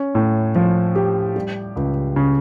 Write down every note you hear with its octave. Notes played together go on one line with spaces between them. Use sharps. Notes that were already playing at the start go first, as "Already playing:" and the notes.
Already playing: C#4
A2
F3
G4
G3
C#2
C#3